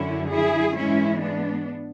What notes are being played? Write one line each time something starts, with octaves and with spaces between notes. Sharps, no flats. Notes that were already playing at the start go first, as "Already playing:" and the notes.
Already playing: F#2 D3 F#3 C#4 E4
E4 G#4
G#2 E3 G#3 C#4 E4
B3 D4